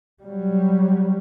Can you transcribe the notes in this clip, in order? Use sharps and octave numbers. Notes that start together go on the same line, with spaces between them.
F#3 G3